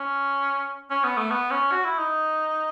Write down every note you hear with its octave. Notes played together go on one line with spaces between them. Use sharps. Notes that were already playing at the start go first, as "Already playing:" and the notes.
Already playing: C#4
C#4
B3
A3
B3
C#4
F#4
E4
D#4